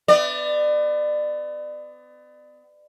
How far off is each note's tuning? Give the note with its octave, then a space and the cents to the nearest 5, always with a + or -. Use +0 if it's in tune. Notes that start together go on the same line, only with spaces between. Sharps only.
B3 +35 D5 +30